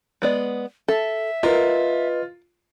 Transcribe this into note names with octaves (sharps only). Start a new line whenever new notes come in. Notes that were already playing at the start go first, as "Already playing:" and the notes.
G#3 B3 D5
A4 E5
F4 A#4 B4 D#5